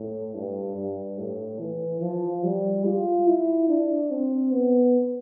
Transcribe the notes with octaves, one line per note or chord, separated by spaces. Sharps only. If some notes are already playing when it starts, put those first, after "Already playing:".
Already playing: A2
G2
G2
A2
E3
F3
G3
F4
E4
D4
C4
B3